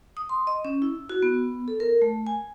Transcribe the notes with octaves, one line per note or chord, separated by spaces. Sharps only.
D#6
C6
D#5
C#4
E4
F#4
B3
A4
A#4
A3
G#5